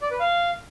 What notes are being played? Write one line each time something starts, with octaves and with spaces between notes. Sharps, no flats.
D5
B4
F5